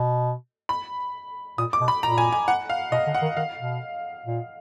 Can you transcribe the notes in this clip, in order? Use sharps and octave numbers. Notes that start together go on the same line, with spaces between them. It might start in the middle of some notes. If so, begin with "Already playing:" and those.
Already playing: B2
B5
A#2 D#6
D6
B2
B5
A#2 A#5
G#5
G#5
F#5
F5
B2 D#5
D3
F#5
D#3
D#3 F5
B2
A#2